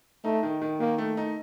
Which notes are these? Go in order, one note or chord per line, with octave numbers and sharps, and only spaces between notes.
A3 D#4
D#3
D#3
D#3 A#3
A3
D#4